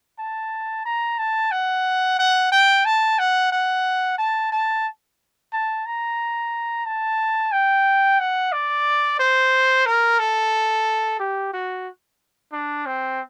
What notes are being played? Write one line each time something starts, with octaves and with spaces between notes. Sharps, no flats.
A5
A#5
A5
F#5
F#5
G5
A5
F#5
F#5
A5
A5
A5
A#5
A5
G5
F#5
D5
C5
A#4
A4
G4
F#4
D4
C4